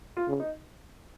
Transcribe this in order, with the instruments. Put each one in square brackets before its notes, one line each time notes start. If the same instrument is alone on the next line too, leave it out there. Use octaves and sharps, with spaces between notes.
[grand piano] F4
[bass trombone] C#3
[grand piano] D#4